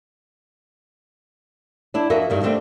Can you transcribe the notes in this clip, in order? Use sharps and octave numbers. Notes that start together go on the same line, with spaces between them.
D4 E4
F2 F#4 A#4 D#5 E5
G2 D#3 G3
G3 A3 C4 D4